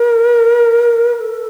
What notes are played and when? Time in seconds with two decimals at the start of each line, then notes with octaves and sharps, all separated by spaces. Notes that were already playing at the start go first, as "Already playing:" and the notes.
Already playing: A#4
1.16 A#4
1.21 A4